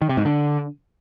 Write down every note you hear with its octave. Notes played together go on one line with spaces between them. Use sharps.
D#3
C3
G#2
D3